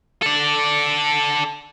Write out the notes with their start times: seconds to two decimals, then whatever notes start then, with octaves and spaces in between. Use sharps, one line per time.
0.22 A4 D5